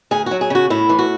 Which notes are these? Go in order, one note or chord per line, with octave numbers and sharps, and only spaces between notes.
D2 G#4
F#3 F#4
G#4
C#3 F#4
A2 E4
E3
F#4